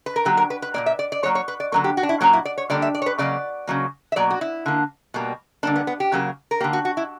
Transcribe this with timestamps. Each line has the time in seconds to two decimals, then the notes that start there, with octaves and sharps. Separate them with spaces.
0.06 B4
0.16 A#4
0.25 D3 F#3 A#3 G4
0.37 A#4
0.50 B4
0.62 B4
0.74 A#2 F#3 A#3 D5
0.86 E5
0.99 D5
1.12 D5
1.23 B2 F#3 A#3 C#5
1.35 C#5
1.48 B4
1.60 D5
1.72 D3 F#3 A#3 A#4
1.84 G4
1.97 F#4
2.03 D4
2.09 E4
2.21 A#2 F#3 A#3 C#4
2.33 E4
2.45 D5
2.58 C#5
2.70 D3 G3 A#3 D5
2.82 E5
2.95 D5
3.02 C#5
3.06 B4
3.18 C#3 F#3 A#3 D5
3.67 C#3 F#3 A#3
4.12 E5
4.16 B2 F#3 A#3 D5
4.30 F#4
4.41 E4
4.66 D3 A#3
5.14 B2 G3 A#3
5.63 D3 G3 A#3 D4
5.76 B3
5.87 B3
6.00 G4
6.12 C#3 F#3 A#3
6.51 A#4
6.60 A#3 G4
6.64 D3
6.73 F#4
6.85 F#4
6.97 E4